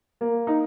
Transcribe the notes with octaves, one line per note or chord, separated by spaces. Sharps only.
A#3
D#4